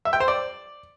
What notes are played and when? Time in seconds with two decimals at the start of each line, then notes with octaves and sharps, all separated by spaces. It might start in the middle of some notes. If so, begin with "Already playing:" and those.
0.05 E5
0.13 G5
0.20 C5
0.28 D5